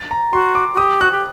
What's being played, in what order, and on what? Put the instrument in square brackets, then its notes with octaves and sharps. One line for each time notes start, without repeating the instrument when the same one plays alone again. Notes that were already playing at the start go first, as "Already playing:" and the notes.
Already playing: [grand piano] A6
A#5
[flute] F#4 [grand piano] C6
[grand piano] D6
[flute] F#4
[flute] G4 [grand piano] D#6
[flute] F#4 [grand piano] F#6
[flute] G4